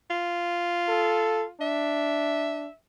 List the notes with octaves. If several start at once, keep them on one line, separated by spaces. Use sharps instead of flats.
F4
A4
D4 E5